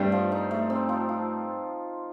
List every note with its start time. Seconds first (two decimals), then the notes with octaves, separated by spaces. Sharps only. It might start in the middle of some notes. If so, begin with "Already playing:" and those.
Already playing: G2 G3 A3 C4
0.12 F3
0.32 D#4
0.51 A3
0.70 C4
0.89 F3
1.09 F4